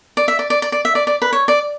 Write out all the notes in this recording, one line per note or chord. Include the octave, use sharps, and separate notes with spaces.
D5
E5
D5
D5
D5
D5
E5
D5
D5
B4
C#5
D5